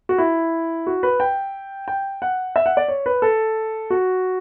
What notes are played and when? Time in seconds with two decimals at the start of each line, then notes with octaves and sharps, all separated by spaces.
0.09 F#4
0.18 E4
0.87 F#4
1.03 B4
1.20 G5
1.88 G5
2.22 F#5
2.56 E5
2.66 F#5
2.77 D5
2.88 C#5
3.06 B4
3.22 A4
3.90 F#4